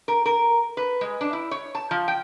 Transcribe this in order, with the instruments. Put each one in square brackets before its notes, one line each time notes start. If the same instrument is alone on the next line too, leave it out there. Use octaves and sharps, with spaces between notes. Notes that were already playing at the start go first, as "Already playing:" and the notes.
[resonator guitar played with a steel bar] A#4
A#4
B4
G#3
D4
E4
C#5
A5
F3
G5